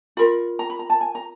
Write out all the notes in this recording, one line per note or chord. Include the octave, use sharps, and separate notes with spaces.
F4 A#4 B5
A#5
B5
A#5
A5
G#5
A#5